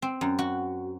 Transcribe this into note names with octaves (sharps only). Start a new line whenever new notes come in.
C4
F#2
F#4